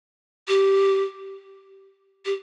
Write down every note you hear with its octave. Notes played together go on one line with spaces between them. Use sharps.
G4
G4